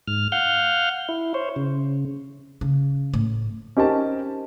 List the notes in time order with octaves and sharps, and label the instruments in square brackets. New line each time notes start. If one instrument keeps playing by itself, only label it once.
[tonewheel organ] G#2 F6
F5 F#5 F6 G6
E4
C5 C#5
C#3
[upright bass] C#3
A2
[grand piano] C#4 D#4 G4 A#4 C5 A5